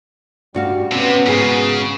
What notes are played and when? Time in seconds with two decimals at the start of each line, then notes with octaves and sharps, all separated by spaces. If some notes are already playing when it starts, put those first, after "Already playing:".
0.54 G2 G3 F#4 F5
0.92 C3 B3 C#4
1.26 G#2 C#3 F#4 G#4